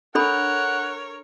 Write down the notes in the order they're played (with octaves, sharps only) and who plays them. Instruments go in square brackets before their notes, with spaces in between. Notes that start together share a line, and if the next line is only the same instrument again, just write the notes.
[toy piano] D4 A4 B5 [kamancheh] A#4 C#5 [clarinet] F#5